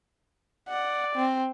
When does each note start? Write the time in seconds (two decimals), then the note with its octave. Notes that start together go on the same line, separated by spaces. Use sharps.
0.69 D5 F#5
1.16 C4